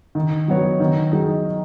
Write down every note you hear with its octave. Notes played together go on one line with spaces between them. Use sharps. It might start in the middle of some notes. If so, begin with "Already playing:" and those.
D#3
F#3 B3 F#4 C#5
D#3
F#3 D#4 G#4